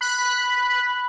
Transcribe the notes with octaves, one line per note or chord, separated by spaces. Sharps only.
B5 F#6